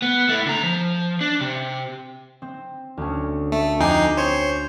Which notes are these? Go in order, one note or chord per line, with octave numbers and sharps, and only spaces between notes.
B3
A3 E4
D3 A#5
F3
D4
C3
C4
D2 C#4
A3
F2 D#4 G5 G#5 D6 C7
C5 C#5